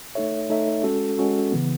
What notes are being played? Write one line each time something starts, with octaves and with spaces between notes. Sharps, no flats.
A3 D#4 A4 C#5 E5
A3 D#4 A4 C#5 E5
G#3 C#4 F#4 A4
G#3 C#4 F#4 A4
C#3 E3 B3